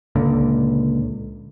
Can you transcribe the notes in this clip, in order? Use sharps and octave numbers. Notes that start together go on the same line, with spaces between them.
C#2 A#2 D3